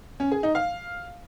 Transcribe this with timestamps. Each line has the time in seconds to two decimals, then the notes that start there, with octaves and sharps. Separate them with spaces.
0.20 C#4
0.32 G#4
0.43 D#4
0.55 F5